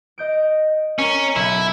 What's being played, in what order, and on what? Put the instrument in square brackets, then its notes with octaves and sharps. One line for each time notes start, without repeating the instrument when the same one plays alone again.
[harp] D#5 G6 D7
[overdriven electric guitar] C#4 [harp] A#4
[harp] B1 [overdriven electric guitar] E4